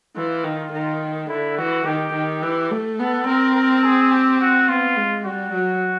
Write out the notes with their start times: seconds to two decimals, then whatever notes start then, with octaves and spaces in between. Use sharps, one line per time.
0.16 E3 F4
0.44 D#3
0.72 D#3
1.29 D3 E4
1.58 E3 F#4
1.85 D#3 G4
2.14 D#3
2.42 E3
2.71 A3
2.99 B3 A4
3.27 C4 A#4
3.55 A#4
3.84 G#4
4.12 G4
4.41 F#4
4.69 B3 F4
4.96 G#3
5.25 G3 F#4
5.53 F#3